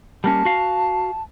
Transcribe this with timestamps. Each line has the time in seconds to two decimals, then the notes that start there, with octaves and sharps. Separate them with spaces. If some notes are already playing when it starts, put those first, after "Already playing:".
0.24 G3 A#3 C#4 A5
0.45 F#4 F5